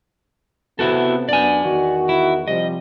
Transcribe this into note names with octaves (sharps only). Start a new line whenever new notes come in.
C3 B3 E4 F#4 A4
F#2 B3 D4 D5 G#5
E2 D#3 F#4
E4
C3 F3 G3 D#5